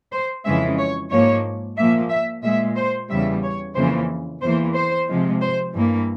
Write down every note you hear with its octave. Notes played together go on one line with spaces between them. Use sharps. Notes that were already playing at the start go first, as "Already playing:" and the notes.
C5
F2 C#3 E3 G#3 E5
C#5
G#2 F3 A#3 C#5
A#2 F3 A#3 E5
E5
A#2 G#3 E5
C5
E2 C#3 G3 E5
C#5
F2 C#3 E3 A#3 C5
E2 E3 A#3 C5
C5
C3 F3 G#3
C5
G2 E3 A#3